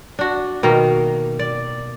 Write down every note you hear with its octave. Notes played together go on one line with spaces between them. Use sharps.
D4 F#4
B2 D#3 A#3
D5